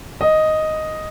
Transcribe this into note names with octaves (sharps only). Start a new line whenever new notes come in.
D#5